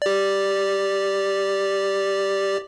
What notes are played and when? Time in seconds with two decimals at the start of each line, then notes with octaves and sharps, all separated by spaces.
0.02 G4 D5